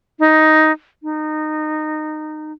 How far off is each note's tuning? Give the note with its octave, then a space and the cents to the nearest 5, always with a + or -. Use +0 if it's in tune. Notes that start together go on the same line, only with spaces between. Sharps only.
D#4 +5
D#4 -20